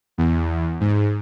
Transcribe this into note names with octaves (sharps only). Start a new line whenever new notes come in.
E2
G#2